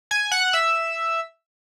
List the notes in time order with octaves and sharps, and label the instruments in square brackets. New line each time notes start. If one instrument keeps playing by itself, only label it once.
[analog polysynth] G#5 G#6
F#5 F#6
E5 E6